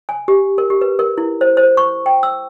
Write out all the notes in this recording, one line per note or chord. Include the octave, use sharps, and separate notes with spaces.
G#5
G4
A#4
G4
B4
A#4
E4
C5
C5
C#6
G5
E6